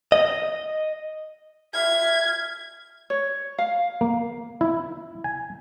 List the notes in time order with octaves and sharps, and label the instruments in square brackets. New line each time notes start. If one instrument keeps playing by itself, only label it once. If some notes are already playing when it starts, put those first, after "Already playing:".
[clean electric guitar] D#5
[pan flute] E5 [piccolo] F6 [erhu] G#6
[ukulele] C#5
F5
[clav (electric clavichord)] A#3
E4
G#5